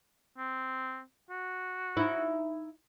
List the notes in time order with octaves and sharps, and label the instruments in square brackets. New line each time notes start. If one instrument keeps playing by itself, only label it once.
[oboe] C4
F#4
[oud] D#4 E4